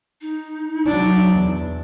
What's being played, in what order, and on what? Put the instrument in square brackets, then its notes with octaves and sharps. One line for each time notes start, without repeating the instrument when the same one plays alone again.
[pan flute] D#4
[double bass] F#3 D4
E2